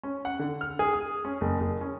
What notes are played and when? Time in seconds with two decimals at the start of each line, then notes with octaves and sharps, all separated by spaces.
0.03 C#4
0.25 F#5
0.39 D3
0.61 F6
0.79 G#4
0.93 D#6
1.25 C#4
1.41 F#1
1.60 F#1
1.81 C#4